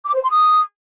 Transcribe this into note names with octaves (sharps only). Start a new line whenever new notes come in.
D6
C5
C6
D#6